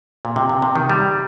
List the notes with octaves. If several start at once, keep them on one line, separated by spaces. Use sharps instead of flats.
A#2
C3
C3
C3
D#3
G3